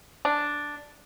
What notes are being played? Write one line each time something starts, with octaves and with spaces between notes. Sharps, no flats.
D4